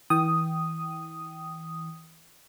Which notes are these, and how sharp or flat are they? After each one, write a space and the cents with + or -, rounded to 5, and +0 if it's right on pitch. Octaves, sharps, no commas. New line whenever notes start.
E3 -25 G5 -20 D#6 +0